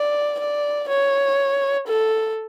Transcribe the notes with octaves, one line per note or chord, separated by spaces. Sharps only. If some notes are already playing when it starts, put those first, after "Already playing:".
Already playing: D5
D5
C#5
A4